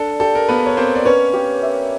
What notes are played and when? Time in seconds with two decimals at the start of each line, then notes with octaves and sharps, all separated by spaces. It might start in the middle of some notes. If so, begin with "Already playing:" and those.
Already playing: D4 A4
0.20 G4 A4
0.35 A#4
0.49 A#3 B3 B4
0.66 C#5
0.77 A#3 C4 C5
0.95 D5
1.05 C#4 B4 C#5
1.33 G4
1.62 E5